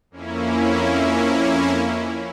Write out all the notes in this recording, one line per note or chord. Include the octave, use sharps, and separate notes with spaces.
F2 A#3 C#4 E4